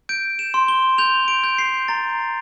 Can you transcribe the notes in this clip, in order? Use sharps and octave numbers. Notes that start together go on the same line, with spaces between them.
G6 D7
E7
C6
G7
G6 F7
D7
G6
C7
A#5 A6